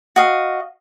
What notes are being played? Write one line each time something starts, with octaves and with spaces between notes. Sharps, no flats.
F#4 D#5 F5